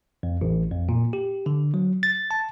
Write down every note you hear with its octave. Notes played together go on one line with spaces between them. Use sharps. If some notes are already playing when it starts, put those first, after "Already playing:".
F2
A1
F2
A#2
G4
D3
F#3
A6
A5